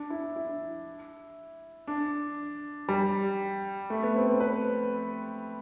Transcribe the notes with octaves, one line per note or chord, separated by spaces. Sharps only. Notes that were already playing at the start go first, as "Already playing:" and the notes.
Already playing: D4
E4
E4
D4
G3
A3
B3
C4
C4
B4